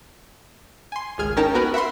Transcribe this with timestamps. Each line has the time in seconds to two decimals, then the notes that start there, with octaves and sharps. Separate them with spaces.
0.92 G#5 C6
1.18 G#1 C#2 G#4 F6 G#6
1.37 C#4 D#4 A#4 G5 A5 A#5
1.54 B3 F#4 A#4 B4
1.74 E5 F#5 B5 C6